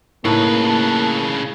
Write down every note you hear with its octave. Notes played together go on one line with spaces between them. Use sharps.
A2 C#3 A#3 D#4 B4 A5